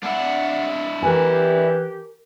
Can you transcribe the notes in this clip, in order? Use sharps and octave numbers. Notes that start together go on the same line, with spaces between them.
D4 E4 F#5
E3 G4 A#4 G#5